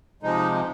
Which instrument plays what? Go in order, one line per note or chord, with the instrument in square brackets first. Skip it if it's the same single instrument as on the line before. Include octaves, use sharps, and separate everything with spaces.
[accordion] C3 F3 G#3 D#4